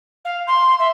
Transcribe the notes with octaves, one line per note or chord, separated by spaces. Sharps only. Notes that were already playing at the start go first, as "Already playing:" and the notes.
F5
C6
E5